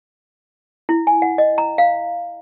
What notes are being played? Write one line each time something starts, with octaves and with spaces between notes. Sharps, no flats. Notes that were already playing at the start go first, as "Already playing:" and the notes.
E4
G#5
F#5
D#5
A#5
F5